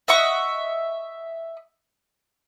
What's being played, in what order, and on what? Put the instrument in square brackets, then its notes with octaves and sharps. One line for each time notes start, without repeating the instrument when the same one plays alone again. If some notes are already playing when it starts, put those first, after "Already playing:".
[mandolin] D#5 E5 F#5 C#6